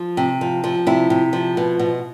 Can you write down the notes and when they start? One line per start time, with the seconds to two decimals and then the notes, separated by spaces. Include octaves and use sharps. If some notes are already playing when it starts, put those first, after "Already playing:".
Already playing: F3
0.17 C3
0.41 F3
0.64 F3
0.87 C3 E4
1.10 C3
1.33 F3
1.57 B2
1.79 B2